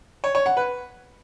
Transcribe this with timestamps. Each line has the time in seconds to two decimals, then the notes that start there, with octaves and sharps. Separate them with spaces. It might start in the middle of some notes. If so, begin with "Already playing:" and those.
0.24 C#5
0.35 C#5
0.46 F#5
0.57 B4